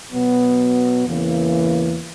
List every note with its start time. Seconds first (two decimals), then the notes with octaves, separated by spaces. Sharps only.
0.12 B2 F#3 B3
1.06 E2 C#3 E3 A#3